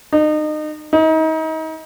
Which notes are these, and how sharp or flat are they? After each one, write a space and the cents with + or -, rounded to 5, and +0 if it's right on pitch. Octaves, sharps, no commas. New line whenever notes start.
D#4 -30
D#4 +35